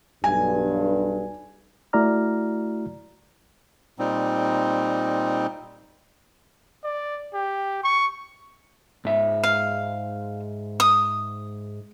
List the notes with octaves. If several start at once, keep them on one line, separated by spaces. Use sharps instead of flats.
B1 G2 G#5
A3 E4 F#4 D5 A#5 F6
A#2 G3 C4 D#4
D5
G4
C#6
G#2 E5
F5
D#6